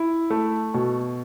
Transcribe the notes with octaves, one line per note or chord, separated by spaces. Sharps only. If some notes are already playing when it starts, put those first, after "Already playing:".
Already playing: E4
A3
B2